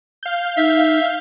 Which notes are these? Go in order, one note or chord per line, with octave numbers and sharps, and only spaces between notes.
F5 G6
D#4 E5